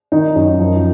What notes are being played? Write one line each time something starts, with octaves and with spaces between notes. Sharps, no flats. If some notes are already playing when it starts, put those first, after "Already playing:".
D#3 D#4
F#2
F3